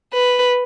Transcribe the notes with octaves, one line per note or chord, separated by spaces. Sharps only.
B4